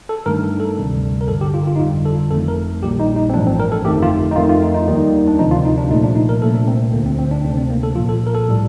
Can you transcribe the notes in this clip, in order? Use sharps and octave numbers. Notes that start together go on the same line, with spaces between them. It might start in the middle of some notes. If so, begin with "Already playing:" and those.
A4
G2 D#3 A3 A#4
A4
D2 C3 G3
A#4
G1 G2 D3 A4
G4
F4
F4
D#4
G1 F2 D3 G3 F4
A4
G1 F2 D#3 A3 A4
A#4
A#1 A#2 G3 G4
D#4
D#4
C4
A1 G2 F3 A3 D4
C4
A#4
A4
G1 F2 D#3 A3 G4
F4
D#4
F2 D#3 A3 F4
F4
D#4
D#4
D#2 D#3 G3
D4
D2 C3 F3 D#4
F4
D#4
D4
C2 A#2 F3 A3 D#4
D4
D#4
A#4
C2 A#2 A3 A4
D4
C4
D2 D3 A3 A#3
C4
C4
D4
D2 C3 D#3 A3 D4
C4
A#3
A4
C2 A#2 F3 F4
A4
A#4
A4
A2 G3